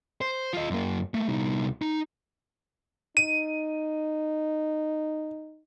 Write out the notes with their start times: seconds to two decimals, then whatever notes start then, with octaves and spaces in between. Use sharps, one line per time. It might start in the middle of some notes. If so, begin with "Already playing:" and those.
0.21 C5
0.53 F4 D#5
0.70 F#2 A#3
1.14 A3 A#3
1.28 C2 D#4
1.82 D#4
3.17 D#4 D#7